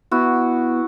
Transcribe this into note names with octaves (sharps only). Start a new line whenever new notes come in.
B3 E4 F#4